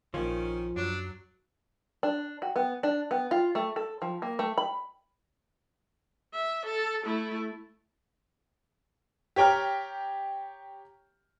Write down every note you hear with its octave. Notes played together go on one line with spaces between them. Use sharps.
A#1 D#3 F3 C#4
F#2 F#3 D4
D4
F#4
B3
D4
B3
F4
A3
A4
F3
A#3
A3
B5
E5
A4
A3 E4
G4 C#5 G5 A#5 F6